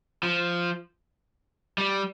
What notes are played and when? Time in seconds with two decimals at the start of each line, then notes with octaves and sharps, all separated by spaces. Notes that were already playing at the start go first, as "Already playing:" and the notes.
0.23 F3
1.78 G3